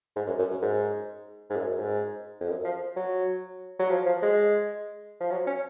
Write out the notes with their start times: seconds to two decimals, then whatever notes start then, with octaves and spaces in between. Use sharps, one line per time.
0.16 G#2
0.27 F#2
0.39 F#2
0.51 F#2
0.62 G#2
1.50 G#2
1.56 F#2
1.75 F#2
1.79 G#2
2.40 F2
2.49 F#2
2.65 F3
2.96 F#3
3.79 F#3
3.90 F3
4.06 F3
4.22 G#3
5.20 F3
5.31 F#3
5.47 C#4